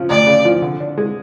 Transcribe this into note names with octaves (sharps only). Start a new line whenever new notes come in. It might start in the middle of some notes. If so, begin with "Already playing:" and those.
Already playing: C#3 F3
D2 D5
C#3
F3
D3
D4
G#3